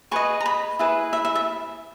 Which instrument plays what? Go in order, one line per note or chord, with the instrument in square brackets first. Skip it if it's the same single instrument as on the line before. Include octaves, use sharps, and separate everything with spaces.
[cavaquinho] G#4 B4 D#5 C#6
A#5
B5
E4 G#4 B4
E5
E5
E5